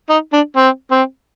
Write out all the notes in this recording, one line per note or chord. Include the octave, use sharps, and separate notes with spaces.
D#4
D4
C4
C4